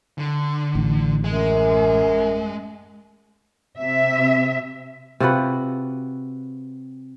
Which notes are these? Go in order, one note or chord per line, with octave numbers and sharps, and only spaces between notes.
D3
A1
F#2 G#3
C3 E5
C3 F4 F#4 B4